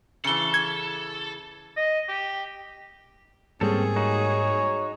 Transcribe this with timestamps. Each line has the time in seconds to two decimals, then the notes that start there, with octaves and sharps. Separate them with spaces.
0.24 C#3 E3 A4 C#7 G7
0.54 G#6
1.77 D#5
2.08 G4
3.61 G#2 G3 A#3 C4 C#4 G#4 A4
3.96 D#4 F#4 C#5